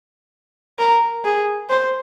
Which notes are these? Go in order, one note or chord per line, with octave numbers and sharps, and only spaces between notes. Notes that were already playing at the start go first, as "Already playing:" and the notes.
A#4
G#4
C5